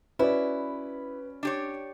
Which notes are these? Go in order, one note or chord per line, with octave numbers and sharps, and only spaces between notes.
C#4 E4 F#4 B4 D5
D4 G4 C#5